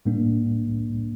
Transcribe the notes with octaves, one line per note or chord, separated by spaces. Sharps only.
A2 G3 A#3 D4